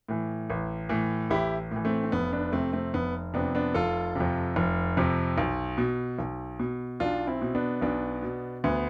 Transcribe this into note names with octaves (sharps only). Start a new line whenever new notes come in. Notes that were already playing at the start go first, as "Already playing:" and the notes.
A2 E3
A1
A2 E3
A1 E4 G4
A2 E3
A3 C4
C4
F1 B3
B3 D4
F2 C3 A3 C4
A3 C4
F1 B3
F2 C3 B3 D4
B3 D4
F1 F4 A4
F2 C3
F1
F2 C3
B1
B2
B1
B2
B1 D4 F4
C4 E4
B2
B3 D4
B1 B3 D4
B2
D2 B3